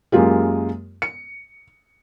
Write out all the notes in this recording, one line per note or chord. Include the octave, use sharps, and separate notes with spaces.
F#2 G#3 A#3 F4 G4
C#7